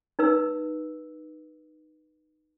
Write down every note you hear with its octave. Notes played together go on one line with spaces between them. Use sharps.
D#4 B4 E6